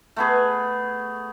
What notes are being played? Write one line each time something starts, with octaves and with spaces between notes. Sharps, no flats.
A3 B3 G#4